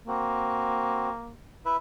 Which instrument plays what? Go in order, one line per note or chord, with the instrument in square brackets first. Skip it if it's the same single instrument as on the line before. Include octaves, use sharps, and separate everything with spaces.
[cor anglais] A#3 [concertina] C4 F#4
[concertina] E4 B4 E5